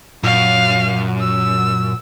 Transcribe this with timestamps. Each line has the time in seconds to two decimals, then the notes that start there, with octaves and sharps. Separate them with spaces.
0.23 F#2 A#2 F5
1.20 E6